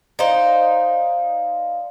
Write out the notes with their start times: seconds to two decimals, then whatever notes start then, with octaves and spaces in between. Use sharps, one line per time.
0.19 D#4 C5 D5 F5